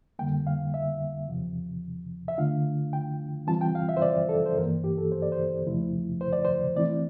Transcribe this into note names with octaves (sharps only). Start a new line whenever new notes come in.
F2 D3 G3 A#3 G5
F5
E5
E2 C3 F3
E5
D3 A3 D4 F4 F5
G5
E3 G3 C4 F4 A5
G5
F5
E5
C5
D5
A4
C5
G2 E3 A#3 A#4
G4
A4
C5
D5
C5
E2 C3 F3 A3 E4
C5
D5
C5
E3 A3 C4 E4 D5